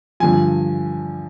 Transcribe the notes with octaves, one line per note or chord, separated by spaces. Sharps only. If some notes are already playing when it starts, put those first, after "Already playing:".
G2 D3 F3 G#5